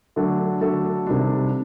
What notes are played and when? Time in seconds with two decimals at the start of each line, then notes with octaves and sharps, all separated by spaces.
0.16 D3 F#3 A3 D4 A4
0.61 D3 F#3 A3 D4 A4
1.07 C3 D#3 G3 D4